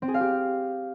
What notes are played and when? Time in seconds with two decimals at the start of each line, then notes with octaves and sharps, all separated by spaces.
0.02 C4
0.08 G#4
0.14 F5
0.20 G4